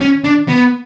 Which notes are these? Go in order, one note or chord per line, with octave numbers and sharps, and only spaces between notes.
C#4
D4
B3